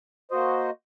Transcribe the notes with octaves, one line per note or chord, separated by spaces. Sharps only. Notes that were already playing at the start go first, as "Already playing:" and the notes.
A#3 F#4 C5 D#5